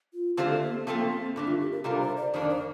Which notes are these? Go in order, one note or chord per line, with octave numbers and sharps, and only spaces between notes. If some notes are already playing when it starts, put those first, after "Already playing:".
F4
D3 A3 C4 F4 G4 C5
A4
A#3
C4
F3 A3 A#3 C4 F4 A4
C4
G2 D3 A3 D4
F4
G4
A#4
C3 G3 D4 F4 A4 A#4
C5
D5
F2 D#3 A#3 D4 D5
C5